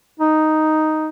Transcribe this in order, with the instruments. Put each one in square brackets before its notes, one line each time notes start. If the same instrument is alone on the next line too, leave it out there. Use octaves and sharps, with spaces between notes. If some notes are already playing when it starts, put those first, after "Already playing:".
[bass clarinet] D#4